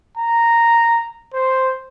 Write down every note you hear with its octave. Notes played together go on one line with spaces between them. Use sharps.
A#5
C5